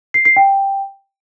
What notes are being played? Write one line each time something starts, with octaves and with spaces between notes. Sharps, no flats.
C7
C7
G5